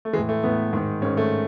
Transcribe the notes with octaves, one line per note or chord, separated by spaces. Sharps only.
A3
A2 E3 G#3
A3
A2 E3 B3
G#2 D#3
G#2 D#3 C#4
A3